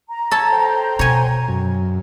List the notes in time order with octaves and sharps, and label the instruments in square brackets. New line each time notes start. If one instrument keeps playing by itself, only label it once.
[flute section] A#5
[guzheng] A4 C#5 A5
[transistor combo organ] C5 G5
[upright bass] B2 [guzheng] C#5 G#5
[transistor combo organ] F#2